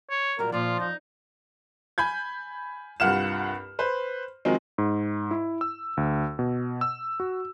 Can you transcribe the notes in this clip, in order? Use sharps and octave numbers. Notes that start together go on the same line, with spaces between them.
C#5
A#2 F#3 G3 A#4
A#2 F3 F4 D5
F2 D#4
G#5 B5 G6 G#6
C2 G2 F4 F#5 F6 E7
B4 C5
D#3 F3 F#3 G#3 C4
G#2
E4
E6
D2
B2
E6
F#4